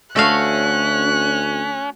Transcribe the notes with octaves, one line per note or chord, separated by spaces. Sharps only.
D2 A3 C#4 F#4 F5 F#6